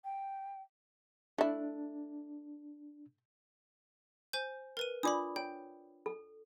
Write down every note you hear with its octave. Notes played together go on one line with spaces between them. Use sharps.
G5
A3 D4 E4
C5 G#5 G6
A#4 B4 D#7
D4 F4 D5 B5 D6 D#6
C#5 G5
A4